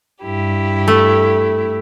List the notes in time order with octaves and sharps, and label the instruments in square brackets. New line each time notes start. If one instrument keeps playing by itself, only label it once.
[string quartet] G2 E4 G4
[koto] A3